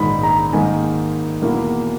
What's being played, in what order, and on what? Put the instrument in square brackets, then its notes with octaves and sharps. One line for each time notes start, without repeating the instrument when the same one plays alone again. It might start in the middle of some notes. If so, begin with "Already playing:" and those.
Already playing: [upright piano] A#1 G#2 D#3 G#3 D#4 B5
A#5
G#2 D#3 A#3 D#4 G#5
E2 B2 A#3 E4